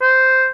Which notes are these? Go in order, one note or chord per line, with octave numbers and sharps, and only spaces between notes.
C5